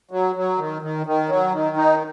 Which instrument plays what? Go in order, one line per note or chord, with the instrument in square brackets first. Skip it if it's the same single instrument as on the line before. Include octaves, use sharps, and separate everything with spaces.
[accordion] F#3
F#3
D#3
D#3
D#3
F#3
D#3
D#4